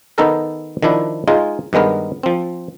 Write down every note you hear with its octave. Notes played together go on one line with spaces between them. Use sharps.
D#3 B3 D#4 A4 A#4
D#3 F3 D4 E4
G#3 D#4 F4 G#4
G2 D#3 G#3 B3 A#4
F3 C4